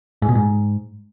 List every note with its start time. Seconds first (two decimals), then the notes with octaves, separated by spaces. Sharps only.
0.22 G#2
0.29 B2
0.35 G#2